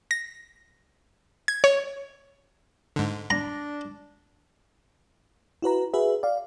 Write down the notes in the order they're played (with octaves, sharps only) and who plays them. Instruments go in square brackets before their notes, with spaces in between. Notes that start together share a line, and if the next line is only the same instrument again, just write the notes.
[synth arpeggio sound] A#6
G#6
C#5
[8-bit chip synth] G#2 D3
[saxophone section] D4 [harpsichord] A#5
[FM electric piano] E4 F#4 B4 A#5
F#4 G#4 B4 E5
D5 F5